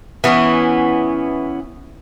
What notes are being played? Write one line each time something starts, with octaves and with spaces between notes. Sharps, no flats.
E3 B3 C#4 E4